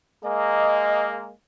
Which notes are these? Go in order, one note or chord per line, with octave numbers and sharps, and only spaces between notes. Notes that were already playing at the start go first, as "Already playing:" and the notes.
G#3 A#3 D#5